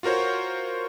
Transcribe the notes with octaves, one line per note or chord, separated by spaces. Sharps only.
F4 F#4 A#4 C5 C#5